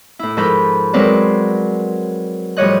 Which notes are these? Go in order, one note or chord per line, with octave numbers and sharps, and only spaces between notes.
A2 E4
G#2 F3 A4 A#4 B5 G6
F#3 G#3 C4 A#4 B4 D5
A2 F3 G3 C#5 D#5 F#6